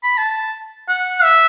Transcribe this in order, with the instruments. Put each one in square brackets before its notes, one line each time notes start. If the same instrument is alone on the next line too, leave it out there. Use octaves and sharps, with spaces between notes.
[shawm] B5
A5
F#5
E5